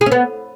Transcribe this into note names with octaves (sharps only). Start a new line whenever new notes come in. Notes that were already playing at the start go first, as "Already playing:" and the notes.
G#4
C#4
B3